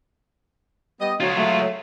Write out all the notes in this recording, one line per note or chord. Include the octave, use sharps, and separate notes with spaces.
G3 B3 D#5
D2 F#3 F4 C#5
F#3 G#3 A3